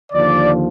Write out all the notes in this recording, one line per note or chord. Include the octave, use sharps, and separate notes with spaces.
D#2 D3 F3 D5